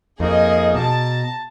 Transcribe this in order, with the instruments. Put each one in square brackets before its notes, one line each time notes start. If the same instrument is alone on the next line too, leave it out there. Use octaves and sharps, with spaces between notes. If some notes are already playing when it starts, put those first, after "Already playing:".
[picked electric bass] F2 [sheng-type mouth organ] A#3 D#4 [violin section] G#4 D#5
[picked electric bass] B2 [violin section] A5 [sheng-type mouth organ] A#5